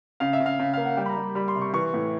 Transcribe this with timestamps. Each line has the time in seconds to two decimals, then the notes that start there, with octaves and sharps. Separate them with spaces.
0.20 C#3 F5
0.33 E5
0.40 C#3
0.46 F5
0.59 C#3
0.74 A#3 F5
0.85 F#5
0.97 G3 G5
1.06 B5
1.09 A#5
1.16 G3
1.35 G3 B5
1.48 C6
1.55 C3
1.61 C#6
1.73 E3 C#6
1.94 A2